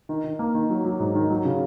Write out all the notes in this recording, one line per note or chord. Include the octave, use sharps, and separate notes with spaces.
D#3
D#3
A#3
D#3
F#3
F#3
G#2
D#3
F#3
C#3